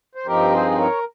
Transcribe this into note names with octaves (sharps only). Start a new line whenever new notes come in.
C5
G2 F3 C4 D#4 G4 A#4
G#4 C5
C5
A#4 C#5